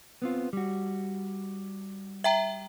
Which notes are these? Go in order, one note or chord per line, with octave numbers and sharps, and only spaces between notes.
B3 C4 F4
G3 F#4
E5 G5 A#5